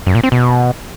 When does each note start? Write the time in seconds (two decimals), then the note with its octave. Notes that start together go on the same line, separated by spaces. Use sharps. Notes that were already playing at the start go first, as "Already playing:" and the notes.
0.07 F#2
0.15 A#2
0.23 C4
0.32 B2